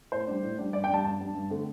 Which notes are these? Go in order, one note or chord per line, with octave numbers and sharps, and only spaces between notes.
A2 C5
G3 D4
A2
G3 D4
G2 D5
G5
G3 D4 A5
G2 A5
G3 D4
G2
D3 A3 C4